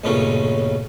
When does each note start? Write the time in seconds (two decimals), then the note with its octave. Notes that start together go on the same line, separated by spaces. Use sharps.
0.04 B1 G2 A#2 C#3 A3 C#4